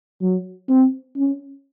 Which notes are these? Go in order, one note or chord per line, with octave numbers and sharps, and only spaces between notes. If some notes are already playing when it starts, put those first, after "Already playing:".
F#3
C4
C#4